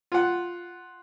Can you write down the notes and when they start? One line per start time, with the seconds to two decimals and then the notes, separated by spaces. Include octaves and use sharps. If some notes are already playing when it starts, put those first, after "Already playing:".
0.12 F4 F#5